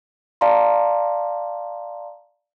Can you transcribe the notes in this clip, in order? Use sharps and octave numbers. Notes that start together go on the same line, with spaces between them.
D5 F5 A5 A#5 C6